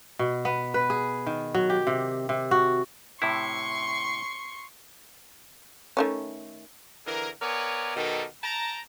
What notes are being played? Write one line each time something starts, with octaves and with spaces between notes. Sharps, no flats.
B2
B3
B4
G#4
D#3
F#3
G4
C3
C3
F#4
A2 C3 E4 C6 C#6
D#3 A3 C#4
D3 E3 G#4 A#4
B3 A#4 C#5 D5 G#5
B2 D#3 G3 A4 A#4
G5 A5 A#5